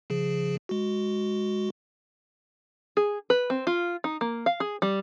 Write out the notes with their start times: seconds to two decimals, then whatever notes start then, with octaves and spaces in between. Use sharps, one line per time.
0.10 C#3 F3 G#4
0.69 G#3 F#4
2.97 G#4
3.30 B4
3.50 C4
3.67 F4
4.04 D#4
4.21 A#3
4.46 F5
4.60 G#4
4.82 G3